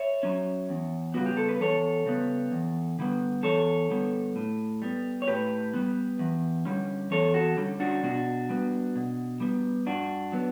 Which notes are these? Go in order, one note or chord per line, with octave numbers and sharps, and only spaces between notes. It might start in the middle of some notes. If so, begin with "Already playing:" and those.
Already playing: C#5 E5
F#3 C#4
E2
C#3 G3 B3 F#4
G4
A4
B4
E2 A4 C#5
C#3 G3 B3
E2
D3 G3 B3
E2 A4 C#5
D3 G3 B3
A2
G3 B3
C#5
A2 G4 B4
G3 B3
E2
D3 G3 C#4
E2 A4 C#5
F#4 A4
D3 G3 C#4
D4 F#4
B2 D4 F#4
G3 B3
B2
G3 B3
G2 D4 F#4
F#3 B3